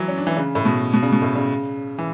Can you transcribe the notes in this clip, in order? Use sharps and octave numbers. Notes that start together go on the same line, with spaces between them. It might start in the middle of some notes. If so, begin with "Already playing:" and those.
Already playing: E3 F#3
C#4
D4
E3
C#3
A2
B2
B2
C#3
B2
A2
C#3
E3